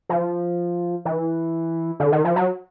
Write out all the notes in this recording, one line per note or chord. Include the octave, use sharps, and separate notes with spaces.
F3
E3
D3
D#3
F3
F#3